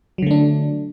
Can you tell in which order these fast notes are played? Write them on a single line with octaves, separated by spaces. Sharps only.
F#3 D3 A3 D4